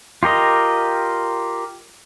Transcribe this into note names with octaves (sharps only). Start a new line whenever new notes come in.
F4 G4 A#4 D#5